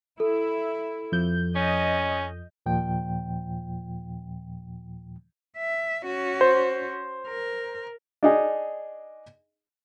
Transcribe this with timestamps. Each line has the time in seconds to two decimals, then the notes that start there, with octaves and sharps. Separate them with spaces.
0.20 E4 A4
1.12 F2 F3 G6
1.56 C#4 D#5
2.66 D#2 A#2 F3 G5
5.57 E5
6.05 C#4 F#4
6.41 C5
7.28 A#4
8.23 D4 D#4 G#4